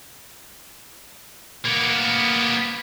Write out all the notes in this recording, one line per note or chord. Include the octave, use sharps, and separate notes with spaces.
A#3 B3